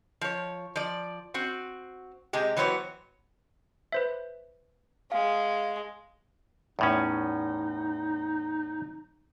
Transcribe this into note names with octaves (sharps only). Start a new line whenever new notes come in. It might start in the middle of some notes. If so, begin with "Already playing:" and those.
F3 C#5
F3 D5
C4 F#4
C3 G#3 G4
E3 F#3 B3 C5 C#5
B4 C5 E5
G#3 F5
E2 A2 C#4 D#4